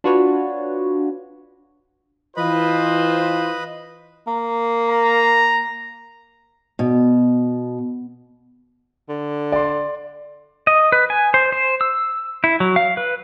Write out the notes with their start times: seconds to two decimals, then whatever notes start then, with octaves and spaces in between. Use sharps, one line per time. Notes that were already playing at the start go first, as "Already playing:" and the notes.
0.04 D4 F4 F#4 B4 C#5
2.37 E3 F4 B4 C5 D#5 B5
4.27 A#3
4.89 A#5
6.79 B2
9.09 D3
9.52 D5 C6
10.67 D#5
10.92 B4
11.10 G#5
11.34 C5
11.52 C5
11.81 E6
12.44 E4
12.60 F#3
12.76 F5
12.97 B4